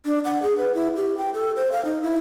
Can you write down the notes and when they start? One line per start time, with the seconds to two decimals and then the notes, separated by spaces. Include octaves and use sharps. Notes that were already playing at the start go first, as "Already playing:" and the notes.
0.05 D4
0.25 F#5
0.43 G#4
0.57 B4
0.75 E4
0.96 G4
1.17 G5
1.34 A4
1.56 C5
1.72 F5
1.85 D#4
2.03 E4